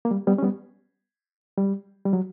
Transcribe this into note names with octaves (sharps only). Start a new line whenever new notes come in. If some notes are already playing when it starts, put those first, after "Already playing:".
A#3
G3
G3 B3
C#4
G3 B3
G3
G3
F#3